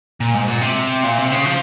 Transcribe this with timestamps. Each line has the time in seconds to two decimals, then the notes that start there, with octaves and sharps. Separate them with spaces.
0.20 A#2
0.34 G#2
0.48 A#2
0.61 C3
1.04 A#2
1.18 C3
1.32 C#3
1.46 F3